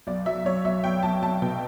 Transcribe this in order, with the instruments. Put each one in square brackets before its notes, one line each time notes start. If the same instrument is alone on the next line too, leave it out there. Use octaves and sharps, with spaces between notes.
[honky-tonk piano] B1 D5
F#3 E5
B1 C#5
B1 E5
B1 G5
B1 A5
B1 A5
B2 G5